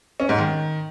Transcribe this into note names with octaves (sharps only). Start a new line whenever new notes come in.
C#4
G#2
D#3